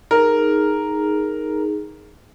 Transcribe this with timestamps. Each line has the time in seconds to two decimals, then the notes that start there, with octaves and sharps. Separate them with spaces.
0.11 D#4 G#4 A#4